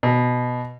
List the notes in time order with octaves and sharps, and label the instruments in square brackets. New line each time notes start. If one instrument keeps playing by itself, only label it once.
[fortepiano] B2